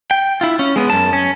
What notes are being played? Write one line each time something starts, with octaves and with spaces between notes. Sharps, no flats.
G5
E4 F4
C#4
G#3 B3
F#2 A5
C#4